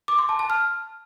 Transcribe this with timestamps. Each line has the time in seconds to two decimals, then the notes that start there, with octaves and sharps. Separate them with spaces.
0.08 D6
0.19 C6
0.29 A5
0.39 A5
0.50 F6